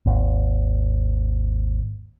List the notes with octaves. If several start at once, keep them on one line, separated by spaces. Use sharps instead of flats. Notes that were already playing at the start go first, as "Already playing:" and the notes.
G#1 D#2